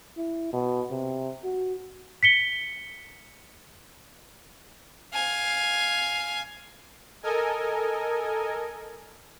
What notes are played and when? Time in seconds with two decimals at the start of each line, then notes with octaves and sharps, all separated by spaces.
0.17 E4
0.53 B2
0.91 C3
1.44 F#4
2.23 B6 C#7 G7
5.13 F5 G#5
7.23 A4 A#4 D#5 G#5